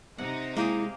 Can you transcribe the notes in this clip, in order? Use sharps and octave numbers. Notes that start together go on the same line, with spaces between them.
C3 D#4 F#5
G#3 A#3 E4 G4 G#4